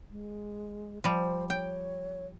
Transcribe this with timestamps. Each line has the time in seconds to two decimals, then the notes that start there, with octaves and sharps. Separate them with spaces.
0.11 G#3
1.04 F3 G3 C5
1.50 C#5 G5